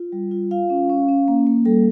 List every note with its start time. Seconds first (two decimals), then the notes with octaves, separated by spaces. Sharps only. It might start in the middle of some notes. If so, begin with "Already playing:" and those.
Already playing: F4
0.12 G3
0.31 F4
0.51 F4 F5
0.70 C#4
0.89 C#4
1.09 C#4
1.28 A#3
1.47 A#3
1.65 G3 A4